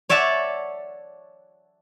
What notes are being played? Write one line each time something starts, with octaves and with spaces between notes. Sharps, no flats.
C#5 D5 E5 F#5 A5